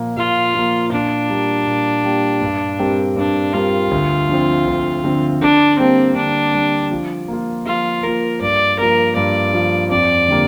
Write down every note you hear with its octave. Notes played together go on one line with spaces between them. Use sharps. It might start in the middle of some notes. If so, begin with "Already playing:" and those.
Already playing: A#2 F3 A#3
A#2 F4
F3 A#3
A#2 D4
G3 A#3 G4
A#2
G3 A#3 G4
G2
G3 C4 G4 A#4
G2 D4
G3 C4 F4 G4 A#4
D2
D3 F3 C4
D2
D3 F3 C4
D3 D4
G3 A#3 C4 G4
D3 D4
G3 A#3 G4
F3
A#3 F4
F3 F4
A#3 F4 A#4
G2 D5
F3 A#3 A#4
G2 D5
F3 A#3
F2 D5
D3 G3 A#3